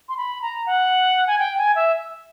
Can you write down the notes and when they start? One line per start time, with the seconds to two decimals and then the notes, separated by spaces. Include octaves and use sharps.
0.09 C6
0.17 B5
0.42 A#5
0.66 F#5
1.27 G#5
1.39 G5
1.58 G#5
1.75 E5